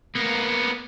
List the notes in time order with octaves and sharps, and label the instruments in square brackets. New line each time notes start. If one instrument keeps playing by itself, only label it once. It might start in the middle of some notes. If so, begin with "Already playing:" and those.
[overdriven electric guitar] A#3 B3